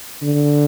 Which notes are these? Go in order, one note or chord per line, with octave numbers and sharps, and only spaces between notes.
D3